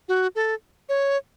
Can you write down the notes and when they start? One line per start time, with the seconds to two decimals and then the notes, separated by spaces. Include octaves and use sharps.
0.09 F#4
0.35 A4
0.89 C#5